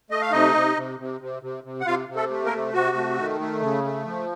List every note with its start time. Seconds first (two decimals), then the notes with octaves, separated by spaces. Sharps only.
0.11 A3 D#5
0.21 F5
0.32 C3 D#4 D#5
0.55 C3
0.76 C3
0.99 C3
1.21 C3
1.42 C3
1.64 C3
1.81 F#5
1.86 C3 F4 F5
2.09 C3
2.15 A3 A4
2.30 A3
2.45 A#3 A#4
2.53 C3
2.74 C3 F#4
2.96 A3
3.18 D#3
3.41 A3
3.62 C#3
3.84 A3
4.06 F3